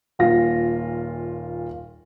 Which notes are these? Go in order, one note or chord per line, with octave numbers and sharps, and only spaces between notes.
D#1 A#2 F4 A#6